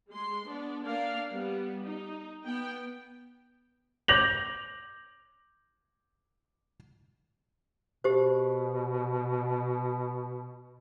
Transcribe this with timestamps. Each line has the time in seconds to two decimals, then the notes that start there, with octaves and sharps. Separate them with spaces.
0.10 G#3 C6
0.47 B3 D4
0.84 A#3 D4 A#4 D5 F5
1.31 G3 B3
1.87 D#4
2.45 B3 G5
4.08 D6 G6 A#6 F7 F#7
8.04 B2 G4 C5